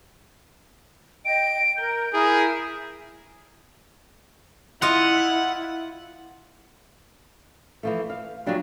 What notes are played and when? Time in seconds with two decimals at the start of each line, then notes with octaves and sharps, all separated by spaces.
1.25 D#5 G5 D7
1.77 A#4 G6
2.13 E4 G#4 A#4 D#6
4.82 E4 F4 D#5 F#5
7.83 E3 F3 A3
8.10 F5
8.46 F3 F#3 G#3 B3 D4 G4